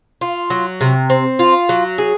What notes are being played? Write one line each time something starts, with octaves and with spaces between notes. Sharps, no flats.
F4
F#3
C3
C4
F4
F#3
G#4